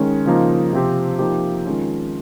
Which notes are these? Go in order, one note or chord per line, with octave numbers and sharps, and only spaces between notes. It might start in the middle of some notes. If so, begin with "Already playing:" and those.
Already playing: D#3 G#3 C#4
C#3 F3 A#3 D#4
C3 F3 C4 G4
F3 A#3 D#4 G4
D#3 G#3 C#4 F4